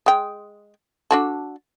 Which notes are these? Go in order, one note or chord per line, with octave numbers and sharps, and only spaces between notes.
G#3 G5
D4 F#4 A4